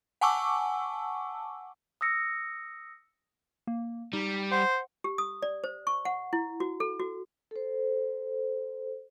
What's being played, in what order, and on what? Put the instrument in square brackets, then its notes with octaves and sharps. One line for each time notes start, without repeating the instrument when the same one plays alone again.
[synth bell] F#5 G#5 A5 C#6 D6 E6
[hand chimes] D#6 E6 A#6 C#7
[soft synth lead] A#3
[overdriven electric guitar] G3 [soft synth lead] D#4
[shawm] C5 [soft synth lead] F#5
[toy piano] G4
D#6
D5
C5
C#6
F#5
E4
F#4
A4
F#4
[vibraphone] A4 C5